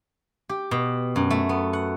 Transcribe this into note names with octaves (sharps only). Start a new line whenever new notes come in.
G4
B2
F#2
A3
B3
F#5